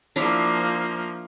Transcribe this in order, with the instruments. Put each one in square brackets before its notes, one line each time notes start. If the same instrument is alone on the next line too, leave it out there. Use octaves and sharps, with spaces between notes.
[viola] F3 A#3 [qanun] D4 E4 F5